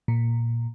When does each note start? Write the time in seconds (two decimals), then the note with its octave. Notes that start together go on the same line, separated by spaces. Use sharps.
0.08 A#2